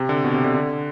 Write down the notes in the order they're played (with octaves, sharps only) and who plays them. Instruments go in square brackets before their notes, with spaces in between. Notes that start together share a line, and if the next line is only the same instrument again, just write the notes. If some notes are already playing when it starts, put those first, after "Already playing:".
Already playing: [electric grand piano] C3
D3
B2
C3
D3
D3